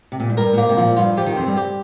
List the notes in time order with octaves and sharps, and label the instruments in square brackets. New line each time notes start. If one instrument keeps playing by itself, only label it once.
[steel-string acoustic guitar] C3
A#2
G#2
[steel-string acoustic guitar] G2 [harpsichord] A#4
[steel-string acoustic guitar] A#2
[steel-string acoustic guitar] G#2 [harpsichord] A#3
[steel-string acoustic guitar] C3
[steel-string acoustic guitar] A#2 [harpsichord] F3
[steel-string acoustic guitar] G2 [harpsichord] F4
[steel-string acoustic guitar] F3 [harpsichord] G4
[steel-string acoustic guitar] D#3
[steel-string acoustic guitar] F2 [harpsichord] C4
[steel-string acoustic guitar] G2
[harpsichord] G4